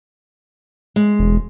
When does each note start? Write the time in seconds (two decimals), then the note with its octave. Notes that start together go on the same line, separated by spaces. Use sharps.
0.96 G#3
1.19 E1